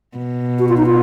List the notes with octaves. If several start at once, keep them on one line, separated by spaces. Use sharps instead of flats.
B2
F#4
F4
D#4
F4